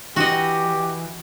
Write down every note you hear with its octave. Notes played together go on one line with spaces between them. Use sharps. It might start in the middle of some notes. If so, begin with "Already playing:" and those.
E3 F#4 G4 D#5